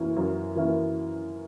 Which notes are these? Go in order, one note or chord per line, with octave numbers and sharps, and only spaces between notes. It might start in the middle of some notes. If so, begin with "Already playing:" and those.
Already playing: F#2 E3 A#3 C#4 E4
F#2
E3 A#3 C#4 E4